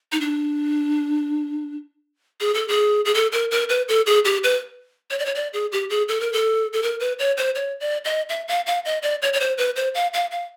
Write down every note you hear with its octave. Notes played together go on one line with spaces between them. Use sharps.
D#4
D4
G#4
A4
G#4
G#4
A4
A#4
A#4
B4
A4
G#4
G4
B4
C#5
D5
C#5
D5
G#4
G4
G#4
A4
A#4
A4
A4
A#4
B4
C#5
C5
C#5
D5
D#5
E5
F5
F5
D#5
D5
C#5
C#5
C5
B4
C5
F5
F5
F5